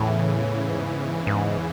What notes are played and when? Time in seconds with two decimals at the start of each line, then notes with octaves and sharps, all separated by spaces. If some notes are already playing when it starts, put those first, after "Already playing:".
Already playing: E2 A2 C#3 E3
0.69 G#2
1.27 G#2